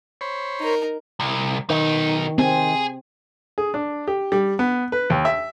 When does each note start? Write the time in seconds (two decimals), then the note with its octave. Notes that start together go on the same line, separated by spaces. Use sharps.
0.21 C5 C#5 B5
0.60 D#4 A#4
1.20 C2
1.70 B2 D#3 D#4
2.38 C4 G#4 G#5
3.58 G#4
3.74 D4
4.08 G4
4.32 G3
4.59 B3
4.92 B4
5.10 D#2
5.25 E5